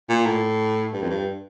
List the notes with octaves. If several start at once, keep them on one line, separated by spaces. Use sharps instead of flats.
A#2
A2
G2
F2
G2